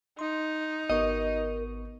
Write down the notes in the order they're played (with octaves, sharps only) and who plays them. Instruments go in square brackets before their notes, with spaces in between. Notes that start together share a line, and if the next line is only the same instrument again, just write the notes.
[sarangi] D#4 [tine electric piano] C6
[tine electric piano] G#1 B3 C#6 [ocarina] A#4 [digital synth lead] D#5